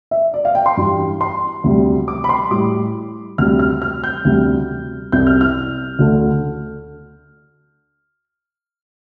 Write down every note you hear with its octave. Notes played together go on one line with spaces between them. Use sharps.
E5
D5
F5
G5
C6
G2 E3 G3
C6
D2 C3 G3
D6
B5
C6
A2 G3 D6
D2 C3 G3 F6
F6
F6
G6
D2 C3 G3
C2 C3 G3 G6
F6
F6
D2 D3 A3